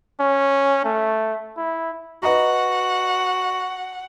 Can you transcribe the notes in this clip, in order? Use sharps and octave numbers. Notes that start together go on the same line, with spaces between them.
C#4
A3
E4
F#4 B4 D#5 F#5 A#5